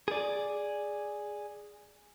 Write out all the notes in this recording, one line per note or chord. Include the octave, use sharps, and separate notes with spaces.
G#4 D5